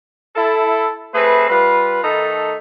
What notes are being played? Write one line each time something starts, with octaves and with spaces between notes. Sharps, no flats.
E4 A4
A3 C4 G#4 B4
G3 F4 B4
D#3 A3 D#4 A4